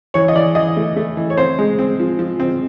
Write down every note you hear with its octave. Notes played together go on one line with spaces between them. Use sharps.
E3 C#5
D#5
E3 D5
E3 D#5
A3
A3
E3
C#5
C4 C5
G#3
C4
F3
F3
C4